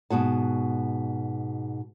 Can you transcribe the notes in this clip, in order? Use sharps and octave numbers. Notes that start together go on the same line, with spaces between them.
G#2 B2 F#4 A5